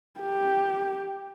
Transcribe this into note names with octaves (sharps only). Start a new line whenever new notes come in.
G4